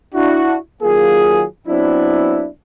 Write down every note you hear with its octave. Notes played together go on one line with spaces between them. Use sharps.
D4 E4 F#4
D#3 F#3 A#3 F4 G#4
F#3 B3 C4 D4 E4